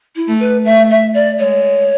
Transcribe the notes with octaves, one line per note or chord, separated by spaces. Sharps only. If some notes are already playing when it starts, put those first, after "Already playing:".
E4
A3
B4
A3 E5
E5
D5
G#3 C#5